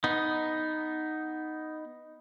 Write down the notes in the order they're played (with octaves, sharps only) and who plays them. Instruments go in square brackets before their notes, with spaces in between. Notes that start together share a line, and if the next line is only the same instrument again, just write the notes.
[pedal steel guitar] B3 D#4